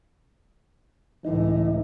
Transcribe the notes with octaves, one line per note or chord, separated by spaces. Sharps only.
C#2 A2 E3 D#4